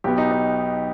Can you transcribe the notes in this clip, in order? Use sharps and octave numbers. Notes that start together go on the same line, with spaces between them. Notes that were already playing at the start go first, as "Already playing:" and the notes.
B1 B2 B3 G4
D#4
D#4